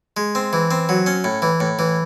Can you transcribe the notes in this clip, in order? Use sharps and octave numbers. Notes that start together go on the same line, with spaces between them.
G#3
C4
E3
C4
F#3
C#4
A2
E3
A2
E3